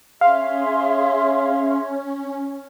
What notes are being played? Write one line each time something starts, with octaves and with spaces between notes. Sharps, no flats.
C#4 G#4 E5 F5 C6